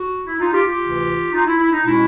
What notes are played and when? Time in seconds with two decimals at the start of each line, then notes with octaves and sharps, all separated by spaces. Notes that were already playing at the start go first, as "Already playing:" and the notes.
Already playing: F#4
0.26 E4
0.40 D#4 F4
0.52 F4 G4
0.66 F4 G4
0.79 D2 C3 E3
1.32 D#4 F4
1.46 E4
1.59 E4
1.72 D#4
1.85 B2 G#3 C#4 E4